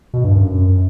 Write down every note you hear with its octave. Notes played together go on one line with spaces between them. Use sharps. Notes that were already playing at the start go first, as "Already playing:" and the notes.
B2
G2
F#2